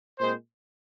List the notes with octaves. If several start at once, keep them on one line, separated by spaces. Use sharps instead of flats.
A#2 G#3 C4 C5